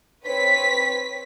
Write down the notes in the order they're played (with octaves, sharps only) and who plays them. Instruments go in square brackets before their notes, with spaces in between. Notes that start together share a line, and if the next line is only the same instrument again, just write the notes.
[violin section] C4 B4 C#5 B6